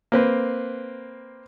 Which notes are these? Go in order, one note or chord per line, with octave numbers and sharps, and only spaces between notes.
A#3 C4 B4